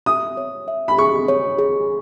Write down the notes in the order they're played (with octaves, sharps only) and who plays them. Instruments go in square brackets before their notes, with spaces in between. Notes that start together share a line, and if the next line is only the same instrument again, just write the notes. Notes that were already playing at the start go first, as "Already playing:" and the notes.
[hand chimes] E5 [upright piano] D#6
[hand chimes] C#5
E5
[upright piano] B5
[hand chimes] G#4 [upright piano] C#6
[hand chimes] C#5
G#4